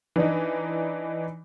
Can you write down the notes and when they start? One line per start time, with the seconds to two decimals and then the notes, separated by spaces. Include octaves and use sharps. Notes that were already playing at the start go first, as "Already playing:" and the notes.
0.16 E3 D4 D#4